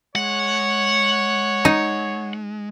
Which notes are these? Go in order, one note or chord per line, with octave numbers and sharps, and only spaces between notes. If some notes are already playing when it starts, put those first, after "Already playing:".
G#3 C#5 F#5
D#4